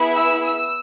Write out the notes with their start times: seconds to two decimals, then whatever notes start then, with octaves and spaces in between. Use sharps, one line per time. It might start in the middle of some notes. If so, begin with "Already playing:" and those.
Already playing: B3 E4 G#4
0.16 E6
0.45 E6